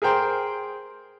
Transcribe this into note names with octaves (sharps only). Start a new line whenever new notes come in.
G#4 A#4 C5 G5 C6